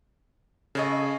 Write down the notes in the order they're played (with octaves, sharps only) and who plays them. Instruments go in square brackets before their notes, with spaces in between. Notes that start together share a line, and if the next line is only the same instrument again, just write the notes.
[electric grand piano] C#3 [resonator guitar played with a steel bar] A4 C#5 D#5